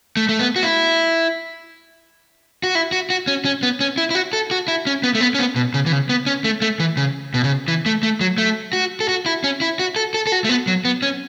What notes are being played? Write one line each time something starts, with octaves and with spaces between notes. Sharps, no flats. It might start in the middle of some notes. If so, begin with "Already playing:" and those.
A3
A3
B3
F#4
E4
F#4
E4
F#4
F#4
C#4
C#4
B3
C#4
E4
E4
F#4
A4
F#4
E4
C#4
B3
A3
B3
C#4
B3
B2
C#3
E3
C#3
B3
C#4
A3
A3
E3
C#3
B2
C#3
E3
A3
A3
F#3
A3
F#4
A4
F#4
E4
C#4
E4
F#4
A4
A4
A4
F#4
A3
B3
F#3
B3
C#4